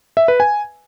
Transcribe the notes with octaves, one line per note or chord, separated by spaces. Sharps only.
E5
B4
G#5